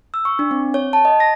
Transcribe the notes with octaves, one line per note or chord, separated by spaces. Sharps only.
E6
C#6
D4
C4
C#5
A5
D#5
A#6